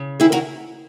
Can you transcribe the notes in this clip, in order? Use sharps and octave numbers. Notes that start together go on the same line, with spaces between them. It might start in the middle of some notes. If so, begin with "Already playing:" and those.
Already playing: C#3
D#3 E4 G#4
F#4 A#4